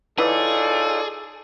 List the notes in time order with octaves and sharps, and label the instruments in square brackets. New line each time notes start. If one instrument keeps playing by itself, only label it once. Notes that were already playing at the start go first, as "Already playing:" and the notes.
[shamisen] E3 [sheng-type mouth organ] D#4 F4 C#5 [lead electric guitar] G#4 [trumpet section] A4 D5